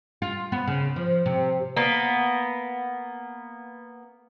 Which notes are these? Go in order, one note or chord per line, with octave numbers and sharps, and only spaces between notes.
F4
B3
C#3
F3
C3
A#3 B3